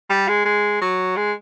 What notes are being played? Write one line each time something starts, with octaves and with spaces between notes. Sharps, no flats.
G3
G#3
G#3
F#3
G#3